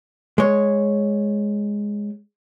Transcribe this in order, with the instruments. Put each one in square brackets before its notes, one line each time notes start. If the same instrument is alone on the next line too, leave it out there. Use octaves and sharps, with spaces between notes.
[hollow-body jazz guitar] G#3 C#5